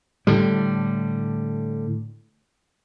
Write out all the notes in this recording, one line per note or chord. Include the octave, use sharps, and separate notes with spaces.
A2 D3 G3